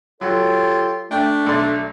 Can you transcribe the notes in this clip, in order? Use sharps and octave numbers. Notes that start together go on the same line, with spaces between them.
F#3 F4 G4 A4 C#5
A3 D4 G5
B1 A3 D5 C6